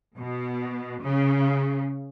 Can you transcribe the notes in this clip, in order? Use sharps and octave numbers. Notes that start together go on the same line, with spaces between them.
B2
C#3